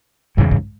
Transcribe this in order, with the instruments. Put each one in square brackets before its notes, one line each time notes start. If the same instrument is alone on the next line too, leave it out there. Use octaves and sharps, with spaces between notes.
[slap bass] E2 C#3 E3 G3 [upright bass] G#2
[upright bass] G#2